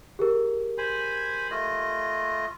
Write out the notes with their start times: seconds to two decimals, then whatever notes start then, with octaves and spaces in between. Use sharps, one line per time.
0.19 G4 G#4 A#4
0.78 C5 G#5 B5
1.51 A3 F4 D#5